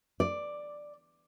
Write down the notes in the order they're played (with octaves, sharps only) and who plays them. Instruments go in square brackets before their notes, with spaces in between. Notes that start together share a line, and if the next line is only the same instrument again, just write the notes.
[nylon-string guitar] D5